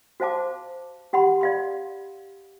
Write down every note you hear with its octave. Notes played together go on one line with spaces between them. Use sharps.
F#4 C5 F5 A5 D6
G4 F#5 B5 C6
D5 F5 C6